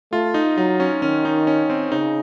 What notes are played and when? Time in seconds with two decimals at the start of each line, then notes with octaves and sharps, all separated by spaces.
0.12 A3 F4
0.34 D#4
0.57 F#3 D#4
0.80 C#4
1.02 D#3 C#4
1.25 D#4
1.47 C#4
1.70 C4
1.92 C#3 D#4